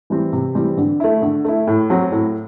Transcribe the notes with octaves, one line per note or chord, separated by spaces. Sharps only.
E3 G3 C4
C3
E3 G3 C4
D3
A3 E4
D3
A3 E4
A2
F#3 C4
A2